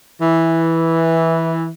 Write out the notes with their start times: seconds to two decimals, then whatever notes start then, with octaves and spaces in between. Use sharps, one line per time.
0.21 E3